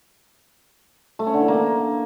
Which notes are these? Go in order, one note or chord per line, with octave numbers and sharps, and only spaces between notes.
A3
C#4
D3
E3
A#3